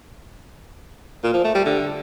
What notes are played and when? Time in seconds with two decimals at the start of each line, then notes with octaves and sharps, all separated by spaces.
1.24 A#2
1.34 F3
1.44 A3
1.55 G3
1.65 D3